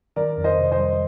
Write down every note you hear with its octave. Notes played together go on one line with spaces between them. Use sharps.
D#3 A#4 D5
F2
C5 D#5
C3
C5 D#5
G3